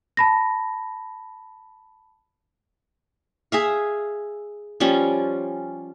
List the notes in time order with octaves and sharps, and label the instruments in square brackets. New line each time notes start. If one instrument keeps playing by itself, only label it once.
[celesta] A5 B5 A#6
[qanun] G#4 E5 F5
F3 G3 C#4